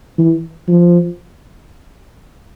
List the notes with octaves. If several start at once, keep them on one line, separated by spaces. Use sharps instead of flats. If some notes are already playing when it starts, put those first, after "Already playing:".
E3
F3